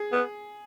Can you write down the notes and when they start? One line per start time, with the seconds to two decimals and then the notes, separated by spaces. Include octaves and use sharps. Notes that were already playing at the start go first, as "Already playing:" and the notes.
Already playing: G#4
0.12 B3